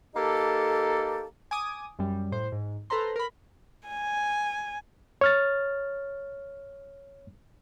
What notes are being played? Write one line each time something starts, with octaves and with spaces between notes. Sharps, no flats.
A#3 D#4 G4 A4
G#5 D6 D#6
F#2 G3
A2 C5
G#2
A4 B4 C5 A#5 C6
A#4 B5
G#5
C#5 F6 A6